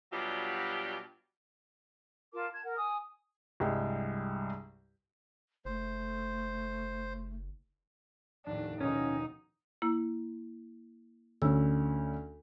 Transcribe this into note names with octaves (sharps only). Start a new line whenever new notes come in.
B2 F#3 G3 D4 F4 G4
F4 A#4 A5 D6
A5 G#6
A#4 F#5
G#5 D#6
C2 G2 G#3 G5
F#1 A3 C5
F1 D#2 A2 D4
D#2 B2 C#4 D#4
A#3 E4
D2 D3 C#4 E6